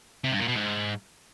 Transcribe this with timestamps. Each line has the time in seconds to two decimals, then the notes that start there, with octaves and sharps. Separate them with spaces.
0.24 C3
0.32 G2
0.40 A#2
0.48 B2
0.56 G#2